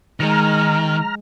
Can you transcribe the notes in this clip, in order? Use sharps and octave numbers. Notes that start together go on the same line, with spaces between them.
D#3 G#3 A#5 F6